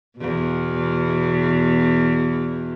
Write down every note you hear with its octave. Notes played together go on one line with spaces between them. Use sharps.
E2 B2